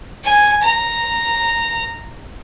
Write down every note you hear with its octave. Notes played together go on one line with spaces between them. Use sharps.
G#5
A#5